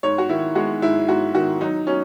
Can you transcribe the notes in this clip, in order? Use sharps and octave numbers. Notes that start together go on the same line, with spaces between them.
G#2 C#5
F#4
D#3 E4
G#3 F#4
G#2 E4
G#2 F#4
D#3 F#4
F#3 D#4
F#3 C#4